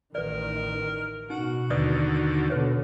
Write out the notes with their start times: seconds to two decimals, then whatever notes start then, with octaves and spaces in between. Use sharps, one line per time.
0.15 A1 D#3 A#4 B4 D5
1.30 B2 D#4 F#4
1.70 D#2 D3 B4 D5 D#6
2.50 B2 D3 B4 C#5